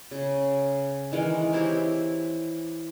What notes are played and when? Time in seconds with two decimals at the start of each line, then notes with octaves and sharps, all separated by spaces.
0.11 C#3
1.12 D#3 E3 G#3 A#4
1.53 C4 E4 G4 C#5